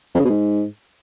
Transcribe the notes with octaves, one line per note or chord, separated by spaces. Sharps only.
F2
C#3
B2
G#2